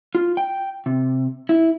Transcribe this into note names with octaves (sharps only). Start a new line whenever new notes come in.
F4
G5
C3
E4